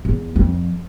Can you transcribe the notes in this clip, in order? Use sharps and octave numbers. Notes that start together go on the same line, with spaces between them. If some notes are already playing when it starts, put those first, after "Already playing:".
E2
F2